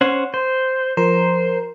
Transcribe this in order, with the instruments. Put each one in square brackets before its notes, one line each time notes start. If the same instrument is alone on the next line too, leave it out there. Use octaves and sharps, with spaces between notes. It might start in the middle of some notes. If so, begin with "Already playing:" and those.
[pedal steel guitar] C#4 C5 F#5
C5
[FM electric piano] F3 A#4 A#5 [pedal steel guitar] C5